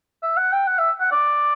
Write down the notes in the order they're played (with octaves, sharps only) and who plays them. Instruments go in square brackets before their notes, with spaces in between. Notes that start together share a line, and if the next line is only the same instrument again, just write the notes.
[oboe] E5
F#5
G5
F#5
E5
F#5
D5